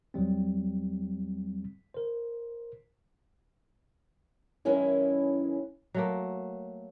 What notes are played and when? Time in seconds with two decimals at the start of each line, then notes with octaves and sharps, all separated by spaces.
0.14 E2 F#3 G3 C4
1.94 A#4 C5
4.65 F#2 D#3 E3 G#3 C#4 E4
5.94 F#3 A3 A#3